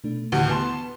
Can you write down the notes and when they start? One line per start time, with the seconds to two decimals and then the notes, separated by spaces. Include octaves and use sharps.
0.04 B2 A3 D4
0.32 D2 A2 D#3 E3 F#4 G4
0.49 B3 B4 A5 C6